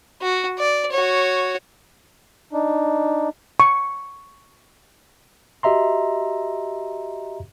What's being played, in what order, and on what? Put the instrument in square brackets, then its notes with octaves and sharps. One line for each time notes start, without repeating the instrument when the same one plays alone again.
[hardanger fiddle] F#4
D5
F#4 C#5
[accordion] D4 D#4
[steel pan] C#6
[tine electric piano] F#4 G4 D#5 E5 A#5 C6